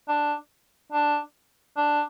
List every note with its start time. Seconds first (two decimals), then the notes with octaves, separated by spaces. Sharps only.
0.08 D4
0.92 D4
1.77 D4